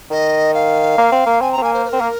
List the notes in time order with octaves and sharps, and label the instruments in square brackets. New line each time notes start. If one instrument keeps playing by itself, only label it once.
[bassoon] D#3 [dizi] D#5
[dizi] F5
[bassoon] A#3
C4
A#3
[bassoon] C4 [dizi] G#5
[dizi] A#5
[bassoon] C4
[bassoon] A#3 [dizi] G#5
[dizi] C5
C5
[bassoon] C4 [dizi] A#4
[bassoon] A#3